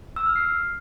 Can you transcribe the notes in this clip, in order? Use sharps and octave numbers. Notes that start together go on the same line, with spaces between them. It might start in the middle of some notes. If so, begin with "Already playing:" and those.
E6
F6
C7